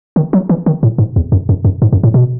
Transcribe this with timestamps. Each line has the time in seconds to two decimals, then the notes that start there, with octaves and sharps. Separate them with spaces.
0.16 D#3
0.33 F#3
0.49 E3
0.66 D#3
0.83 A2
0.98 G#2
1.16 E2
1.32 F#2
1.49 F#2
1.65 F#2
1.82 G#2
1.93 F#2
2.03 A2
2.14 B2